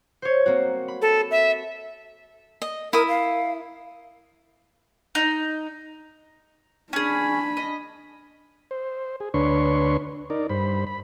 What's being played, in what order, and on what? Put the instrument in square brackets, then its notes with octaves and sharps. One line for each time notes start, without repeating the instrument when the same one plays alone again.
[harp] C5 C#5
A#3 C4 F#4
B5
[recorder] A4
E5
[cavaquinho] D#5
[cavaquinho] E4 D#6 [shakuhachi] A#4
[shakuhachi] F5
[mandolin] D#4
[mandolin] C#4 G#4 [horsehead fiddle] D4 B5
[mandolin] D#5
[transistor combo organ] C5
G#4
D2 D4 B4 C#5 C6 C#6
D#4 A#4 D5
G2 C5 B5
B5